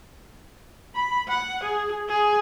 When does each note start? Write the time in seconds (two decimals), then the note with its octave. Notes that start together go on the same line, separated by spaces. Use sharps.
0.95 B5
1.28 F#5
1.64 G#4
2.09 G#4